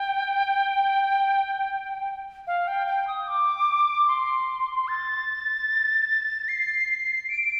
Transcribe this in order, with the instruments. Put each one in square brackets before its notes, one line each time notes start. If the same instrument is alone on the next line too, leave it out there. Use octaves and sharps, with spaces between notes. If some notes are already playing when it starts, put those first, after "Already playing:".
Already playing: [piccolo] G5
F5
G5
G5
D#6
D6
C6
A6
C7
D7